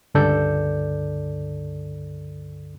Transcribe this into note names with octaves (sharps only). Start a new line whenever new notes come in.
C#2 G2 D3 A4 D5 G6